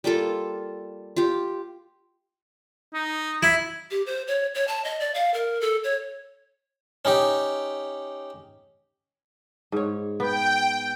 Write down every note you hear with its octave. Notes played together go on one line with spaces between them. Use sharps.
G3 A#3 F4 A4
F4 G4
D#4
E4 G#6
G4
C5
C#5
C#5
A5
D#5
D5
F5
A#4
A4
C#5
C#4 D#4 G4
G#2 C#5
B3 G5